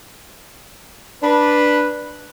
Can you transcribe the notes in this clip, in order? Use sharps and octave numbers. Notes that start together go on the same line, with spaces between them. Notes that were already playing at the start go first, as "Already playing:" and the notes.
D4 B4